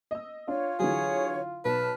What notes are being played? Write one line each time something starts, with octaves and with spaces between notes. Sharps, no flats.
D#5 E6
D4 F4 C#5
D3 E3 F#3 G#4 C#5
B1 B4 A5 F6